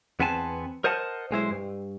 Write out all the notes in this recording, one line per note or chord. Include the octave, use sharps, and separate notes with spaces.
E2 B3 C4 G#5 A5
A#4 C5 D#5 F#5 A5
B1 G#3 E4 C5
G2